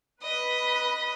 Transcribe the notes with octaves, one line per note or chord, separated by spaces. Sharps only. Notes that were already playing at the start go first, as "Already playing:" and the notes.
B4 D#5 B5